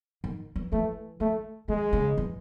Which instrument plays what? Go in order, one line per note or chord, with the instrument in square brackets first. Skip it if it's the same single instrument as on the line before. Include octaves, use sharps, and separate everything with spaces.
[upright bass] D#3
E3
[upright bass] E3 [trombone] A3
[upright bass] D#3 [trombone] A3
[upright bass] D#3 [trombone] G#3
[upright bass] C#3
E3